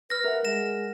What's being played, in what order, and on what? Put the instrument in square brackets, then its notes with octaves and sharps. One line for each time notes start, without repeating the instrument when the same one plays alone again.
[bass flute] B4 [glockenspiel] F6 A#6
[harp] A#4 F#5 [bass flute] E5
[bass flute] G#3 [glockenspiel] A#6 E7